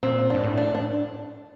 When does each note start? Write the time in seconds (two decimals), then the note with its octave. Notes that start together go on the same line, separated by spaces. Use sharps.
0.03 A#2 C4
0.30 G#2 D4
0.44 A2
0.57 D4
0.75 D4